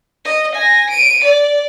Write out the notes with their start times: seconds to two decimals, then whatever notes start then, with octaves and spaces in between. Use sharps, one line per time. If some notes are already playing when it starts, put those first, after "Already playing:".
0.25 D#5
0.55 G#5 A#6
0.90 D7 D#7
1.24 D5